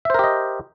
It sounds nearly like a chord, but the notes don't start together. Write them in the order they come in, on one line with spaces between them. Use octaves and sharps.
E5 C5 A#4 G4 D#5